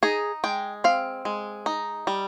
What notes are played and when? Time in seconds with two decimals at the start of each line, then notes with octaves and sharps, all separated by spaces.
0.03 D#4 G#4
0.44 G#3 G5
0.84 C4 F5
1.25 G#3
1.66 D#4
2.07 G3